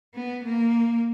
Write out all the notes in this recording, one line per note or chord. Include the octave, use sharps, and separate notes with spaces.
B3
A#3